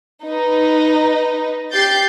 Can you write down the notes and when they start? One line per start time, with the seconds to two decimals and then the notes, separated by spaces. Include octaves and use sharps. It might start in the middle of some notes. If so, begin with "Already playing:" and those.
0.25 D#4 B4
1.73 G4 G6 A6 C7